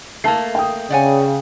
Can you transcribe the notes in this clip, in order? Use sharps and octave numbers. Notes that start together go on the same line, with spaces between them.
A3 A#3 A5 C7
G5 D#6
C#3 D5 F#5 G#5